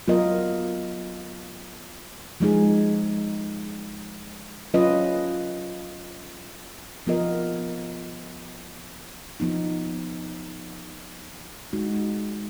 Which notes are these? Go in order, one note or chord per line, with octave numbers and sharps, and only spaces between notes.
F#3 B3 F4 A#4 D#5
F3 G#3 D#4 G#4
F#3 C#4 F4 B4 D#5
F3 B3 F4 A#4 D#5
F3 B3 D#4
G#3 D#4 F#4